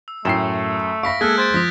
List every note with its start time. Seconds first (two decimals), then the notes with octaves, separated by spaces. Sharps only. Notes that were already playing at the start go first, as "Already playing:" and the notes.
0.08 E6
0.25 F#2 A2 A3 G5 C7 E7
1.03 E5 F5 B5 C#6 A#6 B6 D7
1.21 G#3 A#3 G#4 A4 E5 F6 F#6 G#6
1.38 C5 G6 A6 D7
1.54 F3 D#6 A#6 B6